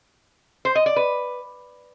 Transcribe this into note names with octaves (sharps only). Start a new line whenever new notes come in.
C5
D#5
D5
B4